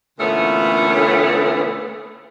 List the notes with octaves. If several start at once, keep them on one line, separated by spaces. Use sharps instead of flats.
A#2 D3 E3 A3 B3 C#4